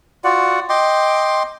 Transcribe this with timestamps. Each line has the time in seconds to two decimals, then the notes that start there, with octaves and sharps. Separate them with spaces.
0.24 F4 F#4 D5 F#5
0.69 D#5 G5 C6 D6